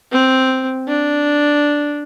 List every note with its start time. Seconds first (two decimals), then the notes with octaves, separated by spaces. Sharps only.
0.12 C4
0.88 D4